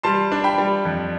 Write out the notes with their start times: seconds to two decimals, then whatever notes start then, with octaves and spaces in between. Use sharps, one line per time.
0.03 G3 A5 C6
0.32 D4
0.44 G5 B5
0.58 G3
0.85 F2